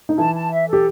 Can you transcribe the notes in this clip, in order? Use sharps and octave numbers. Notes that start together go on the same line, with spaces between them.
D#4
E3 E4 A5
A5
E5
G4 A4